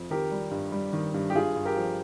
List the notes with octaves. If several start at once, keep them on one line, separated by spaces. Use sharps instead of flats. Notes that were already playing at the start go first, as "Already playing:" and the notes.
Already playing: F2
D#3 G4 A#4
G3
G2
G3
D#3
G2
G4
G2 F4 G#4
G2
G4 A#4
F3